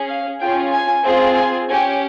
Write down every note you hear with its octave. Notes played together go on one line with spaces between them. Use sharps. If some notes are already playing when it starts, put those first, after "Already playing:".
Already playing: C#4 G#4
F5
C#4 F4 G#4 G5
G#5
C4 F4 G#4
G#5
C#4 G4 G#5